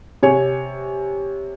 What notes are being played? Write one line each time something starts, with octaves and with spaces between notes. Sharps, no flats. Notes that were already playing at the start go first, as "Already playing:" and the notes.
C3 C#5 G#5